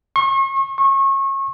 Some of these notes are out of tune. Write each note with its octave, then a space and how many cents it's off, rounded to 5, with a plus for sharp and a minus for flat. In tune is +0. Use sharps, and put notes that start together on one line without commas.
C#6 -40
C#6 -30